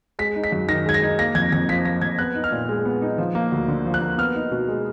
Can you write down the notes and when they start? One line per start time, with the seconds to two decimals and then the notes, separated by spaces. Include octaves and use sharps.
0.19 G#3 B6
0.36 D#4
0.44 B6
0.52 F#2
0.68 D#3 A#6
0.86 G#3 G#6
0.94 A#6
1.03 D#4
1.19 A#3 A#6
1.35 F2 G#6
1.52 F2 A#6
1.69 F3 B6
1.85 A#3 A#6
2.01 F2 G#6
2.19 B3 F#6
2.35 D#4
2.44 F6
2.52 A#2
2.69 G#3
2.85 B3
3.02 D#4
3.18 F3
3.35 A#3
3.51 D2
3.68 D3
3.86 F3
3.94 F#6
4.01 A#3
4.18 B3 F6
4.36 D#4
4.51 B2
4.68 G#3